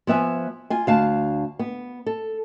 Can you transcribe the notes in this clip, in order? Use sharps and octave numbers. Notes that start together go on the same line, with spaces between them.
F3 B3 E5 G#5
F4 G#5
D2 F5 A5
B3
A4